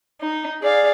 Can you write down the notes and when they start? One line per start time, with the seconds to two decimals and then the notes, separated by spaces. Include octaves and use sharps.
0.20 D#4
0.62 G#4 D5 F5